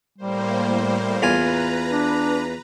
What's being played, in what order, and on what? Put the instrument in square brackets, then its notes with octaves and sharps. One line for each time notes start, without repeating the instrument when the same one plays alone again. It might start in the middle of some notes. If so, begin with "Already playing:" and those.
[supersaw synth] A2 A#3 C5 [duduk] G3
[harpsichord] E2 F4 G#5 [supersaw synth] B4 A#5
[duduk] D4